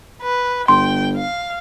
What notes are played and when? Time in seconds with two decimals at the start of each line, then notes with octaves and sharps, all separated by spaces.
0.23 B4
0.68 G1 G5 C6
1.16 F5